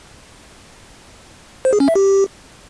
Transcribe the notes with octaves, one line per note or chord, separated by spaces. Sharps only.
C5
G#4
C#4
E5
G4